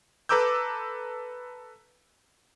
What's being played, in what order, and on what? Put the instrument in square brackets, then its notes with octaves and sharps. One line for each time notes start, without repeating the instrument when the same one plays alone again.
[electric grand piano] A4 B4 A#5 D6 E6 G6